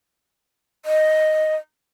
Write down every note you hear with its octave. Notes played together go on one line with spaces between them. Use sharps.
D#5